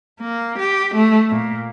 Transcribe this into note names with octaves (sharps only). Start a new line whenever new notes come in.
A#3
G4
A3
A#2